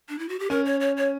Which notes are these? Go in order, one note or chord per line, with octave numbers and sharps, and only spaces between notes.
D4
E4
F#4
G4
C#4 A#4
C#5
C#5
C#5